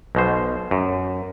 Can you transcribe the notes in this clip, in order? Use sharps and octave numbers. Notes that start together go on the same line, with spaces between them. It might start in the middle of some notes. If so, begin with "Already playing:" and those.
B1 B2 C5
F#2